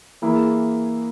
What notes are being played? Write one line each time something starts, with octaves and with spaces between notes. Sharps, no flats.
E3 A#3 E4 G#4